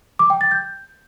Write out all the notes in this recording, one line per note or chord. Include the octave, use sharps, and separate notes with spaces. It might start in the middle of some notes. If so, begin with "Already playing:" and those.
D6
G5
A6
G6